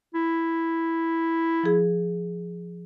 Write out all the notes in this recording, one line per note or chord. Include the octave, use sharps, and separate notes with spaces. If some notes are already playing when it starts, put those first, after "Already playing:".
E4
F3 G#4